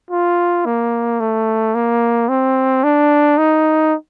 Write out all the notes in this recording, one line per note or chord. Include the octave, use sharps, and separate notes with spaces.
F4
A#3
A3
A#3
C4
D4
D#4